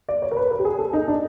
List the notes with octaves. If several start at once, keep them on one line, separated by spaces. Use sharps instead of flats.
D5
C#5
A#4
B4
A#4
G4
G#4
A4
D#4
D4